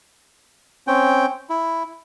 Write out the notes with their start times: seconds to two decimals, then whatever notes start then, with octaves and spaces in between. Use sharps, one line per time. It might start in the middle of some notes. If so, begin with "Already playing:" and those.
0.87 C4 C#4 G5
1.50 E4